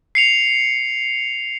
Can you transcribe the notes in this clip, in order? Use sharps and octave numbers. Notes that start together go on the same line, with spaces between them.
C7 C#7 F7